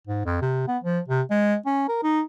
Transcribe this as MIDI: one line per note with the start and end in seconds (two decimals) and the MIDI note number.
0.07 0.21 44
0.25 0.39 41
0.42 0.63 48
0.68 0.78 59
0.84 1.00 53
1.08 1.22 48
1.30 1.56 56
1.66 1.87 61
1.88 1.98 70
2.03 2.22 63